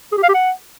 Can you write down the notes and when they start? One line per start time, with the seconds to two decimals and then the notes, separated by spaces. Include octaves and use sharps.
0.12 G#4
0.18 G4
0.23 F5
0.29 G4
0.34 F#5